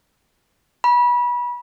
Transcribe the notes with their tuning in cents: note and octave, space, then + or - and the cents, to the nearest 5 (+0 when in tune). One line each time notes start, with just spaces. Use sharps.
B5 -25